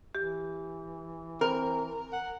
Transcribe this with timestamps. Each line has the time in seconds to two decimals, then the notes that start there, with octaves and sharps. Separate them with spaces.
0.15 E3 G4
1.41 C4 A#4
2.13 F#5